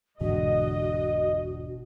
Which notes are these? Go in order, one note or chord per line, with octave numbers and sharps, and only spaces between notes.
G1 E2 G#2 B2 D3 F#4 D#5